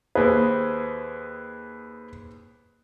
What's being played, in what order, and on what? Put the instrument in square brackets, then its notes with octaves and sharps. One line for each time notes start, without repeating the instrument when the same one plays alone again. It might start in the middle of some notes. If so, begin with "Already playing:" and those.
[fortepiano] D#2 G#4 [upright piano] B4 C5